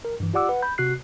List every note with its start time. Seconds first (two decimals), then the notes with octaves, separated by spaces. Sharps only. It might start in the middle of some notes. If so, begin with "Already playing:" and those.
0.05 A#4
0.20 G2 E3
0.34 F4 G4 D5 F#5 D6 E6
0.49 B4 F#5
0.62 B5 G6
0.78 C3 F#4 F#6 C7